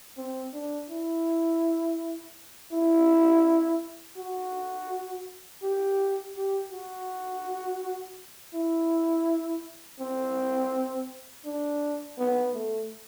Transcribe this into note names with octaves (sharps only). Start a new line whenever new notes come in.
C4
D4
E4
E4
F#4
G4
G4
F#4
E4
C4
D4
B3
A3